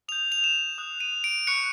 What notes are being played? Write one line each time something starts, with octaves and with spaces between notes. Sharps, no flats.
D#6 G6 F7
F7
E7
D#6 F#6
D#7
D7
C#6 F#6 C#7